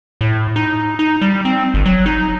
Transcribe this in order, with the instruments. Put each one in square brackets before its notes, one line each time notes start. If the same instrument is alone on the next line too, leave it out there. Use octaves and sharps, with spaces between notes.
[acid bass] A2
D#4
D#4
G3
C4
G1
F#3
D#4